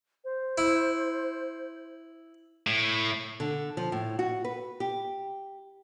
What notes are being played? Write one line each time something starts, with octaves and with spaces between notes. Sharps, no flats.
C5
E4
A2
D3
F3
A2
F#4
B4
G4